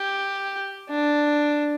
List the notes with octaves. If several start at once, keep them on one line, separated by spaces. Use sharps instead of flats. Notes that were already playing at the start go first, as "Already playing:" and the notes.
Already playing: G4
D4